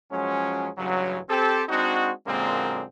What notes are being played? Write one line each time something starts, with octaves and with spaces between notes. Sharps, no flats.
F#2 F3 F#3 G#3 C#4
A1 G2 C#3 F#3
C4 G4 A4
G#3 C4 D4 D#4 F#4
F#2 A#2 D3 G#3 A#3 C4